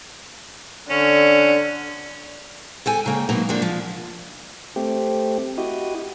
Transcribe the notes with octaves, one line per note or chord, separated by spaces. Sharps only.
D3 C#4
A4 G5 G#5
C#3 A#3 G5
B2 F#3 A#3 D#4
F3 F#3 A#3 D4
F3
A3 C4 G4
E4 F#4 G4 D#5